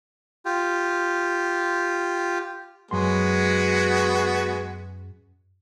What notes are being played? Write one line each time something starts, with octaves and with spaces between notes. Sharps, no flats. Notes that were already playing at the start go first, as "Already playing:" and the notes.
F4 G4
F#2 G#3 B3 F#4 C6